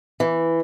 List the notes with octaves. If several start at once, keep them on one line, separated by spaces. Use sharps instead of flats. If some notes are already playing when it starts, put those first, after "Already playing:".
E3